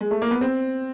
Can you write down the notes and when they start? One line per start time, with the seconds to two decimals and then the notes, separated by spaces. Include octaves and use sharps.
0.01 G#3
0.11 A3
0.22 A#3
0.31 B3
0.41 C4